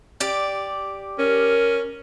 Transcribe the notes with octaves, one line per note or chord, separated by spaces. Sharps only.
G4 D5
C#4 A#4